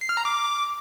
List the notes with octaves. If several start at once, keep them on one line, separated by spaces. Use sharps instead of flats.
C7
F6
A#5
D6